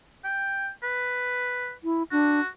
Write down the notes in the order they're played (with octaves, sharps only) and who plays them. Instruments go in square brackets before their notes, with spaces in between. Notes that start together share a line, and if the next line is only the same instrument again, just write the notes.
[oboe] G5
B4
[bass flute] E4
[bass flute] D4 [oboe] F#4